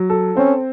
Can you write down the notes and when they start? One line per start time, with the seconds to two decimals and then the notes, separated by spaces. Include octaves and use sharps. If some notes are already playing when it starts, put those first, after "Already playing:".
Already playing: F#3
0.10 A4
0.37 C4 C#4